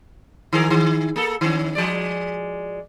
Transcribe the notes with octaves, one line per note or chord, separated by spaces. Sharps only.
D#3 G#4 A#4
D#3
A#3 A4
D#3 C#4
F3 G#3 D5